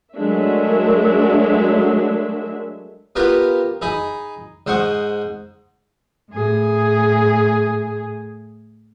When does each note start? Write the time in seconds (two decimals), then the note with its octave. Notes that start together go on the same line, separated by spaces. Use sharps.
0.15 F#3 G#3 A3 D4 A#4 E5
3.16 B3 F4 G4 A#4 B4
3.81 D#4 G#4 B5
4.67 G#2 C5 F#5 C6 C#6 D#6
6.31 A2 G#4